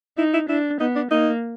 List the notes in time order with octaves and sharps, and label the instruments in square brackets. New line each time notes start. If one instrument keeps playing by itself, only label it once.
[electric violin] D#4 [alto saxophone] E4
[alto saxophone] E4
[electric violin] D4 [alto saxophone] E4
[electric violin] B3 [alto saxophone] D#4
[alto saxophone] D4
[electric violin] A#3 [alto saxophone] D#4